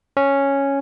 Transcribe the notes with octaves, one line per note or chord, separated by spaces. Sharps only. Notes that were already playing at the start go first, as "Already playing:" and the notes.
C#4